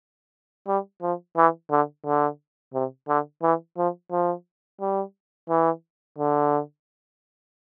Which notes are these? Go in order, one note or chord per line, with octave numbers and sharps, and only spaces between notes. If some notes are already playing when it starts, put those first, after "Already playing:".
G3
F3
E3
D3
D3
C3
D3
E3
F3
F3
G3
E3
D3